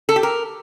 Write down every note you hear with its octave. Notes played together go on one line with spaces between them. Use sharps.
A4
G4
A#4